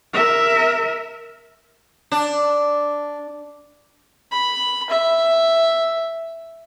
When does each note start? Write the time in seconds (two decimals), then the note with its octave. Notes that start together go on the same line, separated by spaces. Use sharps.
0.13 A#4 E5
2.12 D4
4.32 B5
4.90 E5